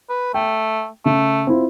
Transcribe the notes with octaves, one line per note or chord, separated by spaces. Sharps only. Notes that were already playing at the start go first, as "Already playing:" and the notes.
B4
A3 G5
C#3 A3
C4 E4 F4